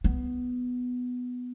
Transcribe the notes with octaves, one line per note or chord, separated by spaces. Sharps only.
B3